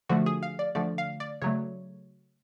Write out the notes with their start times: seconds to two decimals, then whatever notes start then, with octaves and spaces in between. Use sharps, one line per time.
0.09 D3 F3 A3 F#4
0.26 G#4
0.43 F5
0.59 D5
0.75 D3 F3 A3 D5
0.98 F5
1.20 D5
1.42 C#3 F#3 A3 C#5